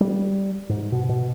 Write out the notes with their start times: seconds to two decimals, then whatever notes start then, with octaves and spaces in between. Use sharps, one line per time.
0.01 G3
0.69 G#2
0.92 B2
1.09 B2